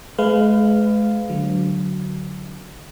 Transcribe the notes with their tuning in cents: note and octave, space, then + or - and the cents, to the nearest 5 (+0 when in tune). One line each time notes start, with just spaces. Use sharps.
G#3 +35 B4 +30 F5 +0
D3 +0 F#3 +0